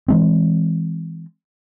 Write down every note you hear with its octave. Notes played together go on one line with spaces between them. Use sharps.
E3 G#3 C4